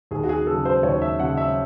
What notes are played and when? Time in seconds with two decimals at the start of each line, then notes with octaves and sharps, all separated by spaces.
0.11 D#2 G#4
0.23 F#4
0.29 G#4
0.47 C#3 F#3 A4
0.65 C5
0.83 D#2 C#5
1.02 E5
1.20 C#3 F#3 F#5
1.37 E5